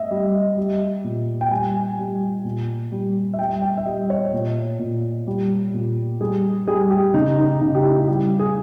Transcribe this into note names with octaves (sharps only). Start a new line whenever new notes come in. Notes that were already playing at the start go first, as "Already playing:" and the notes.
Already playing: D#5 E5
G3
G3
A#2
G5
G3 G#5
G3
A#2
G3
E5
G3 G5
G5
E5
G3 D#5
C#5
A#2
A#2
G3
A#2
G3 G#4
G3 G#4
G4
C#3 D#4
D#4
C#3 D#4
G4
E4
G3 G4
G#4